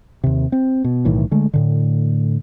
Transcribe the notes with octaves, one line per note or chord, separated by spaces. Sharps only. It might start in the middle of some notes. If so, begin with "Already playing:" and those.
D#2 C3
C4
B2
B1 A2 D#3 E3
D3 G#3 A3
A2 D3